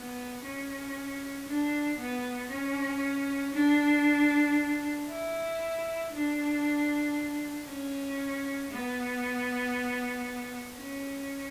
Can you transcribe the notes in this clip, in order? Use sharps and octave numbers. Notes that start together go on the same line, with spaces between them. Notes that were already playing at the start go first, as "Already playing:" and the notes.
Already playing: B3
C#4
D4
B3
C#4
D4
E4
D4
C#4
B3
C#4